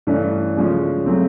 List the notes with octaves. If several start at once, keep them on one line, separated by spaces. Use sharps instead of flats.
G2 E3 A3 C#4
C#3 F3 G#3 C#4
C#3 F#3 A3 C4